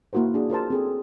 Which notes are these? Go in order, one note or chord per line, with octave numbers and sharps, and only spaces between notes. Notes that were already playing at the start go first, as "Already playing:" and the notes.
A#3 E4 F#4 A#4 C5
D4 F#4 G#4
F4 A#4 C5 A5
C4 G#4 A4